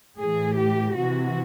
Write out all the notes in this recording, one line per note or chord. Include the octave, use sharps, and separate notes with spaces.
A2 E3 G#4
G4
C3 E3 F#4